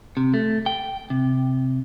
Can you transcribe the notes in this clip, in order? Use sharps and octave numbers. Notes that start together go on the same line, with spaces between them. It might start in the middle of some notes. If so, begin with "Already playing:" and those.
C3
A3
G5
C3